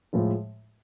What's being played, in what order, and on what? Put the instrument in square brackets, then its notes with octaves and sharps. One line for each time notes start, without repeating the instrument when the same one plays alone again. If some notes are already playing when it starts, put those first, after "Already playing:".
[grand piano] A2 F3 G#3